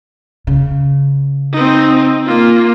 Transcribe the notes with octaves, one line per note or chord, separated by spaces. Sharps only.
C#3
C4 D#4
A#3 F4